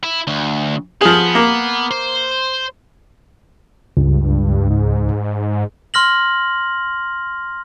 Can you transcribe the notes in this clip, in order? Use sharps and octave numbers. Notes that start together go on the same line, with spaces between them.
E4
D2
F3 B3 G#4
A#3
C5
C#2 G2
G#2
C6 F6 A#6 F#7